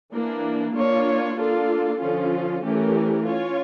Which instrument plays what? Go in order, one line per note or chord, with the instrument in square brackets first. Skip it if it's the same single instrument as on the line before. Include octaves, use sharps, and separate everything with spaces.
[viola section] E3 A#3 D4
A#3 D4 F4 C#5
A#3 D4 F4 A4
D3 F3 C#4 F4
E3 A3 C#4 G4 A#4
C#4 F4 C#5